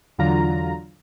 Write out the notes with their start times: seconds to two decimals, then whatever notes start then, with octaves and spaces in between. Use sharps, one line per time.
0.18 E2 D3 F#3 F4 A#5